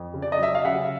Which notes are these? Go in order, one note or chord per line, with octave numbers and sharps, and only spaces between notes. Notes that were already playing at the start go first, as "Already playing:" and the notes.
Already playing: F2
C#3
D5
D#5
F#3 E5
F5
C#3 E5 F#5